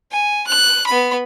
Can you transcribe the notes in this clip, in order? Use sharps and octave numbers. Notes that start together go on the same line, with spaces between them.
G#5
F#6
B3 B5